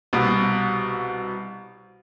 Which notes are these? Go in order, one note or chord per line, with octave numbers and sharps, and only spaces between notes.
C2 B2